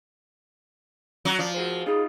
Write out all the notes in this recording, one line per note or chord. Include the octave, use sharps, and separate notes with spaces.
F#3 F#4
F3 F4 D5
F#4 G#4 C5
D#4 F4 G#4 D#5